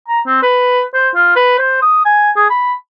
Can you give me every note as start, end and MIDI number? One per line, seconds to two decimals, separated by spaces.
0.08 0.20 82
0.26 0.39 60
0.43 0.83 71
0.94 1.09 72
1.15 1.33 65
1.36 1.58 71
1.59 1.81 72
1.82 2.03 87
2.05 2.31 80
2.36 2.45 68
2.50 2.73 83